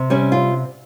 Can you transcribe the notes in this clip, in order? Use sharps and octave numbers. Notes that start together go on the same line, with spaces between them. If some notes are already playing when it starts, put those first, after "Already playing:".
Already playing: C3
G3 C#4
F4